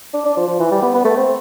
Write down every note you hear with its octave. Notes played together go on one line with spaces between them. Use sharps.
D4
D4
F3
F3
E3
G3
B3
B3
A3
C4